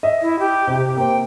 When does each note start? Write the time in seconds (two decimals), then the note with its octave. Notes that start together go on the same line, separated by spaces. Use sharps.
0.03 D#5 E5
0.22 E4
0.39 G4
0.67 C3
0.97 A#3 C5 G5